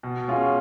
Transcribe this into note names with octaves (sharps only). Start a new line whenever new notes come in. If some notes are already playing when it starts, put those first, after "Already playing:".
B2
G#3 C#4 F4 G#4